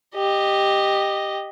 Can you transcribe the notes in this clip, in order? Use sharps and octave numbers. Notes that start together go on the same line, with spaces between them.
G4 D#5